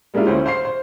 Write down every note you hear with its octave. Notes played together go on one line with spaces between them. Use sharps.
G3 G#3 A#3 D4 E4 F4
D2 C#4 E4 C5
C5 F5 C6 C7
C5